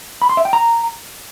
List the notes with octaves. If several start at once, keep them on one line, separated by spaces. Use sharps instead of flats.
B5
C6
E5
G5
A#5